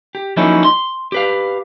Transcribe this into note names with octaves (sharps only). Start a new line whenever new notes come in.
G4
F3 F#3 A#3 C#4 D#4 E4
C6
G4 B4 F5